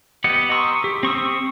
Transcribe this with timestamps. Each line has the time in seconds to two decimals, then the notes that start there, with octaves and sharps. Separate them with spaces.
0.24 B3 G4 D#5 F#5
0.51 A#5 C6 C#6 D#6 E6
0.84 G4
1.03 C4 C#6 D#6 E6